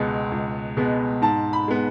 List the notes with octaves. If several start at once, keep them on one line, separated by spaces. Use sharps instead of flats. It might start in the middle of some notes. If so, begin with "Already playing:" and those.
Already playing: C#2 B2 G#3 B3
C#2
B2 G#3 B3
G#2 A5
B5
G#3 B3